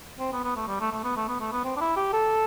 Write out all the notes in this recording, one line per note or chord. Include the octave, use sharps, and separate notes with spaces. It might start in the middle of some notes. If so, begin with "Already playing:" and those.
C4
B3
B3
A3
G3
A3
A3
B3
A3
B3
A3
B3
C4
D4
E4
G4
A4